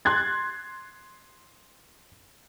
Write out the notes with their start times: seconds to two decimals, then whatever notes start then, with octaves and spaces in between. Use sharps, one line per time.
0.05 C6 F#6 G#6 A6